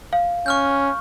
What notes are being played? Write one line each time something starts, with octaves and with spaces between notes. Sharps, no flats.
F5
C#4 C#6 F6 G6